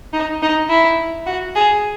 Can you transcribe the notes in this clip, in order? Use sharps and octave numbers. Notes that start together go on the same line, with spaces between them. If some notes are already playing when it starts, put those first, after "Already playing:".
D#4
D#4
E4
F#4
G#4